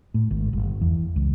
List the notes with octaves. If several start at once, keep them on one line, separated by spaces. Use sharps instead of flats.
A2
G#1
G1
E2
C#2